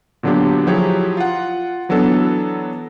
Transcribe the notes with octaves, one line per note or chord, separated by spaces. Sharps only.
A#2 D3 F#3 B3 D4 G4
F3 F#3 E4 G4 G#4 C#5
F4 F#5
E3 F#3 B3 D4 A4